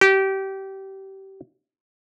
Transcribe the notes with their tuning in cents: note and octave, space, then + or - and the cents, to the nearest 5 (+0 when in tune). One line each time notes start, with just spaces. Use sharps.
G4 -25